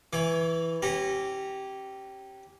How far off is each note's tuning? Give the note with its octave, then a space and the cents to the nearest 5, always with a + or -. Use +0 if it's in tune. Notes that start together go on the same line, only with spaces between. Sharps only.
E3 +0 C#5 +30 D6 -15
C#4 -30 G4 -15 A#5 -15